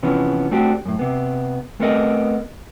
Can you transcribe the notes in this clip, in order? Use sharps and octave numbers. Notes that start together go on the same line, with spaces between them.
C3 E3 F3 B3 C#4
A3 C4 D4 F#4 G4
F#2 A2
C3 B3
A3 B3 C4 A4 A#4 D#5